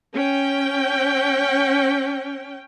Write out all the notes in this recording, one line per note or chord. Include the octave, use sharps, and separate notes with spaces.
C#4 G5